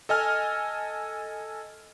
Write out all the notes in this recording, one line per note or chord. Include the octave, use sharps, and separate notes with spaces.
A4 D#5 G#5 F6